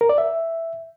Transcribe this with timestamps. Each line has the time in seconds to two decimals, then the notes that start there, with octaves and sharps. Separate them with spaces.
0.01 A#4
0.09 D5
0.18 E5